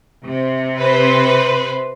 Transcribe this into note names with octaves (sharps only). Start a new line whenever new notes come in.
C3
B4 C5